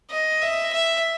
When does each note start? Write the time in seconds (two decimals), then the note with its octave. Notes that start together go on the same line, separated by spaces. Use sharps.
0.11 D#5
0.42 E5
0.73 E5